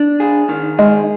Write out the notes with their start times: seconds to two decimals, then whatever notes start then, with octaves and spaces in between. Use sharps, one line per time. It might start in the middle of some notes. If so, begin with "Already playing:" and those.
Already playing: D4
0.20 G#4
0.49 D#3
0.79 G#3 G#4